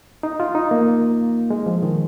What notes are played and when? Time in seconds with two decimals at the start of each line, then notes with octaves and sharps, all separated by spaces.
0.23 D#4
0.40 F4
0.55 D#4
0.71 A#3
1.50 G#3
1.66 F3
1.83 D#3